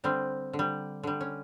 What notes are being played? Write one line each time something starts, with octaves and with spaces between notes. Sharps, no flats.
D3 G3 C4
D3
G3
D3 G3
C#4